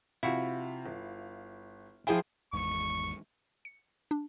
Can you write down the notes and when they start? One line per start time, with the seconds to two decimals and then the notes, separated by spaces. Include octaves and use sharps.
0.23 C3 F3 E4 F#4 F5
0.86 G1
2.07 F3 E4 G#4 C5 G5 G#5
2.53 G#1 E2 G#2 C#6
3.65 C#7
4.11 D4